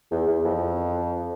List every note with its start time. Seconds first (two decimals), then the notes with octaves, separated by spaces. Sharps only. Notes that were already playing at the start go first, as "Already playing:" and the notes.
0.11 E2
0.28 E2
0.45 F2